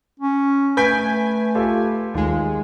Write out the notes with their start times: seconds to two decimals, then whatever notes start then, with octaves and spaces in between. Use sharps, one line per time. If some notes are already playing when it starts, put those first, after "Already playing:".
0.20 C#4
0.77 A3 B4 G#5 G6 B6 D7
1.55 F4 G4 A4
2.14 D#2 G#3 F4